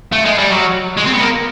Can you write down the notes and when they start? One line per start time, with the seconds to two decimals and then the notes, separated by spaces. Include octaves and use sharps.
0.12 A3
0.25 G#3
0.38 G3
0.50 F#3
0.97 G#3
1.06 C4
1.14 B3
1.21 A#3